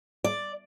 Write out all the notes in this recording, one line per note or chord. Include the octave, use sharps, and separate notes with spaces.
D5